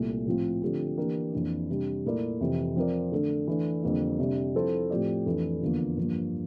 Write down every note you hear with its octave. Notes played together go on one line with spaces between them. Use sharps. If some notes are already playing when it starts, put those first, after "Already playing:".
Already playing: C2 A#2 A3
A2 F3 C4 F4
D3 F3 A3 C4 G4
E3 A#3 D4 G4 A#4
F2 E3 A#3 D4
C3 G3 D4
A#2 A3 E4 A#4 D5
F2 C3 E3
F3 C4 F4 A#4 D5
D3 A3 D4
E3 A3 D4
F2 D3 G3 A#3 D4
C3 G3 D4
F3 C4 E4 A4 C5
A2 F3 C4 G4 D5
F2 E3 A3 D4
E2 D3 F3 A#3
G2 F3 A#3